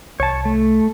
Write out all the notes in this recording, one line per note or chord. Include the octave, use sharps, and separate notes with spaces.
C2 C#5 A5
A3